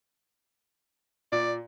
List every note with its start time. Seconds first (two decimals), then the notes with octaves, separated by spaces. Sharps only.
1.32 A#2 D5